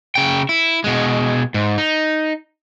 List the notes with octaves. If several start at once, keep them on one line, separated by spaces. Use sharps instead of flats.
C#3 G5
E4
B2 G#3
G#2
D#4